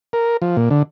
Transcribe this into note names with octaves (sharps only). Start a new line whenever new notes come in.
A#4
F3
A#2
D3